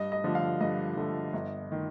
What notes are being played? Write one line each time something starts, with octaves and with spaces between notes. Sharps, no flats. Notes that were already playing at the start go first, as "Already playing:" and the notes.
Already playing: G2 D#5
D#5
D3 F3 A3
F5
G2 D#5
D3 F3 A3
G1
D#3